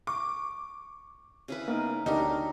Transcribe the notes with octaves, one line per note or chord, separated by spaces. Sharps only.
C#6 D6
C#3 E4 B4
A#3 B3 D#4 A#4
D2 F#3 D4 D#4 G4 A#4